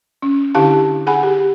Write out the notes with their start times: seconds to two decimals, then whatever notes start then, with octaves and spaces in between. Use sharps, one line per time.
0.22 C#4
0.55 D3 D4 E4 G4 F5 A5
1.07 G#4 F#5 G#5 B5
1.23 G4 G#4